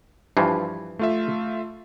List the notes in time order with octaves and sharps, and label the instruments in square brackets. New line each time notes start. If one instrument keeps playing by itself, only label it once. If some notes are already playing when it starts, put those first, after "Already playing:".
[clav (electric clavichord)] G2 E3 F3
[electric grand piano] A3 F4 E5